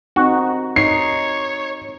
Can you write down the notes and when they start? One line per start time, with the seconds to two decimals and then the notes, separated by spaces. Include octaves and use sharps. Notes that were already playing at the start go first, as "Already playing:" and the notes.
0.16 C4 D#4 F#4
0.76 D#4 C#5 C7